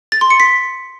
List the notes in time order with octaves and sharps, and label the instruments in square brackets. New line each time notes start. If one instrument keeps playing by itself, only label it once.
[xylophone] A6
C6
C#7
B6